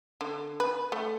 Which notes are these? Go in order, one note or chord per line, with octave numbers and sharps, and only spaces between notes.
D3
B4
A3